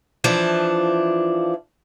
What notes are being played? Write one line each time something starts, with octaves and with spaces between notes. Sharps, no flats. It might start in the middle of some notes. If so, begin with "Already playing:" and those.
E3 F3 D4